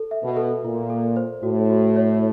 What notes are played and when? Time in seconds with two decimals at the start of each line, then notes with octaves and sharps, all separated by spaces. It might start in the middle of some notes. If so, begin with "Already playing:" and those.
Already playing: A4
0.11 E5
0.23 B2
0.37 A4
0.64 A#2 F4
0.90 A4
1.16 C5
1.43 A2 F#4
1.70 F#4
1.96 C#5